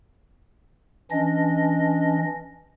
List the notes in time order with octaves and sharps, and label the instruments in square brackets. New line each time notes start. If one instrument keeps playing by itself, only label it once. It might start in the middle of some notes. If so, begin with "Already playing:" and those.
[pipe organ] E3 C#4 D4 D#5